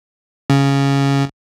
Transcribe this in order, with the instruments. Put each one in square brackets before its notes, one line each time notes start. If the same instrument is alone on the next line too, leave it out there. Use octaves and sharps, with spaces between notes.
[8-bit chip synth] C#3